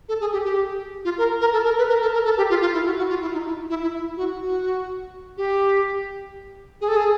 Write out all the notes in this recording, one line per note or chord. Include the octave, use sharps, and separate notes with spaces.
A4
G#4
G4
G4
F4
A#4
A#4
A4
A#4
B4
A#4
A4
A#4
A4
G4
F4
F4
E4
F#4
F#4
F4
E4
D#4
E4
E4
E4
E4
F#4
F#4
G4
G#4
A4
G#4